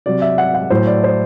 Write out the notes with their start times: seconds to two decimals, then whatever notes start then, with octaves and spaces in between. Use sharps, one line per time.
0.06 C3 F#3 D5
0.22 E5
0.38 F#5
0.54 F#5
0.70 A2 F#3 C5
0.87 D5
1.03 C5